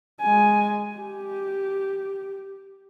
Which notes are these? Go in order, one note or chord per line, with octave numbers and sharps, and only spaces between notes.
G#3 G#5
G4